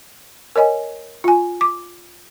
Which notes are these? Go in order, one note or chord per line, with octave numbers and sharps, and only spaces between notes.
A#4 C#5 D#5 G#5
F4 G#5
D6